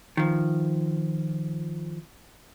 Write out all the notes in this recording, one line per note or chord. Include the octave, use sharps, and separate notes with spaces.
D#3 F3